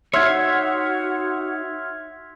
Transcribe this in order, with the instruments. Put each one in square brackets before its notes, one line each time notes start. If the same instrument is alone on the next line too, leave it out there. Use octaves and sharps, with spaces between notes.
[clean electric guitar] D#4 C#5 [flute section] F#4 F#5 [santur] E5 [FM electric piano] C6 F6 G#6